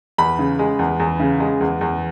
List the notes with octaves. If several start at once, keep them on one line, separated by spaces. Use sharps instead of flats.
E2 B5
C#3
G#3
E2
E2
C#3
G#3
E2
E2